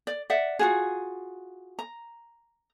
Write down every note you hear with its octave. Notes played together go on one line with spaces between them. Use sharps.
D5
D5 E5 F#5
F4 F#4 G#4
A#5